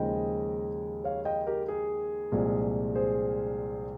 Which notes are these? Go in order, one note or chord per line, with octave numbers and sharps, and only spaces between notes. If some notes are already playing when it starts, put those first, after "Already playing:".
Already playing: D#2 C#3 F3 G#3 D#5 G5
C#5 F5
D#5 G5
G4 A#4
G#4
C2 A#2 F3 G#3
G#4 C5